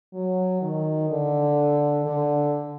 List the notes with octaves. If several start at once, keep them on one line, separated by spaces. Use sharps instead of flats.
F#3
D#3
D3
D3